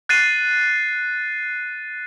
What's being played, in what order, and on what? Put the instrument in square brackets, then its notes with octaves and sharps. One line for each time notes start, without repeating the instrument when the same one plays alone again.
[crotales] F#6 A6 C7 D#7